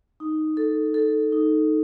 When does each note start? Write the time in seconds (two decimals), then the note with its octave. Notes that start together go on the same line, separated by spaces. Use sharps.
0.20 D#4
0.57 A4
0.94 A4
1.32 D#4